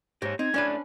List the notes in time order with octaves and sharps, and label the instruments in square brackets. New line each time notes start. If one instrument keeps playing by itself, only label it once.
[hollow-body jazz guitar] G#2 [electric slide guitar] G4 C#5 [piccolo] A#6
[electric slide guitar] C4 [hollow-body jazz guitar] D#4 [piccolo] G#6
[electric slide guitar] A2 A3 D5 [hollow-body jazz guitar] C#4 D4 B4